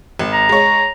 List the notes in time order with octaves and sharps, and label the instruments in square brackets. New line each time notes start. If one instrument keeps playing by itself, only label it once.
[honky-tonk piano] G#1
[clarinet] A#5
[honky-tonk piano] G#3 C#5